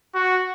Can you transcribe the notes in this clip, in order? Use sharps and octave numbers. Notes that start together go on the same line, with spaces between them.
F#4